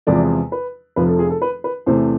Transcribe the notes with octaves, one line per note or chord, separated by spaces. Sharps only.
E2 C3 F3 G#3 D5
B4
F1 F2 C3 F3 B4
A4
G#4
A4
B4
B4
E2 C3 E3 A3 C5